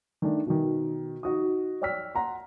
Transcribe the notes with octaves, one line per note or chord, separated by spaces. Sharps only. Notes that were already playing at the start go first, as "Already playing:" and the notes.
D#3 A3 D4
B2 D#3
D#4 F#4 D#6
C#5 D5 G5 E6 F6 B6
F#5 A#5 C6